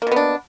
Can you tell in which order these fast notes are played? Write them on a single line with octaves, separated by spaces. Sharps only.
A#3 B2 B3 D4